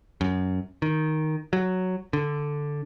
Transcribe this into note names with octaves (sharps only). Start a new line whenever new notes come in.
F#2
D#3
F#3
D3